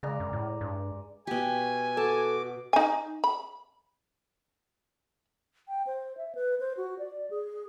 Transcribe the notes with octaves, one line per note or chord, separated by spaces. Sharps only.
C#3 G#3 D5 A#5
F#2
A2
G2
B2 G4 G#5
F#4 A4 A5 D6
D#4 G#5
B5
G5
C5
E5
B4
C5
F#4
D5
G#4